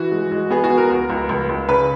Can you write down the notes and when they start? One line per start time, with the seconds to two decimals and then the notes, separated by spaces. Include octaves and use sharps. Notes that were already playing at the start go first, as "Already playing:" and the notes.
Already playing: E3 F#4
0.12 G#3
0.32 G#3
0.50 B3 G#4
0.64 F#4
0.70 B3
0.78 A#4
0.90 C#2
1.10 C#2
1.29 C#2
1.49 C#2
1.69 C#3 B4